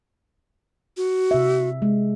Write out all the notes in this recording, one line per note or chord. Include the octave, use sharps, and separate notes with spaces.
F#4
C3 E5
G#3